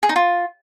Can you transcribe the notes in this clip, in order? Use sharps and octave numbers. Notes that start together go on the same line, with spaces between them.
G#4
D#4
F4